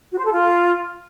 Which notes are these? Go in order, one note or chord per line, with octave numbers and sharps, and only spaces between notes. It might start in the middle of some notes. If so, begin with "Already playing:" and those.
F#4
C5
A4
F4